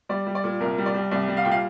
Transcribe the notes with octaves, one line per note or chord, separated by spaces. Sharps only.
G3 D5
G3
D5
A#2
C2 A#4
G3
D5
G3
C2 D5
G3
F5
A#2 G5
F5